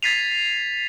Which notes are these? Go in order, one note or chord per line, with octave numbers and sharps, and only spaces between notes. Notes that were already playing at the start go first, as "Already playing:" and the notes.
G#6 A6 B6 C7 D#7 F7